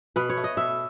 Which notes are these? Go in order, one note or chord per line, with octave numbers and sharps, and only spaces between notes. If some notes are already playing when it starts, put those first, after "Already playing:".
B2 B4
C#5
A3
D#5
B2 E5